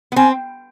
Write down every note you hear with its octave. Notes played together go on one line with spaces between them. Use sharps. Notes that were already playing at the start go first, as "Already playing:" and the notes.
B3
C4 G#5